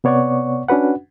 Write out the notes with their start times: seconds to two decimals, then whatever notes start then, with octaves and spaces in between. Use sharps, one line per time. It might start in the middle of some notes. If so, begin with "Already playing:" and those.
0.04 C3 B3 C#5 D5 F#5 C#6
0.69 C#4 D4 F#4 B4 F#5